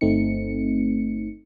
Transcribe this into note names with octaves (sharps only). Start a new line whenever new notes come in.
G1 A3 C4 D#4 C#7